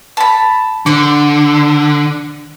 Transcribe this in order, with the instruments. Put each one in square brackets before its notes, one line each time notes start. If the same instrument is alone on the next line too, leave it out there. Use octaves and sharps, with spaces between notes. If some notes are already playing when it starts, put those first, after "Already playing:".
[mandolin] A5 B5
[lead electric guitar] D3 [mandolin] C5 D6